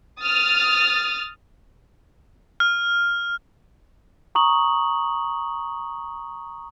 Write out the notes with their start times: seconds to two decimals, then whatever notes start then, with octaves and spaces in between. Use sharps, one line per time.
0.20 D#6 F6 A6
2.60 F6
4.35 A#5 C#6 D#6 F#7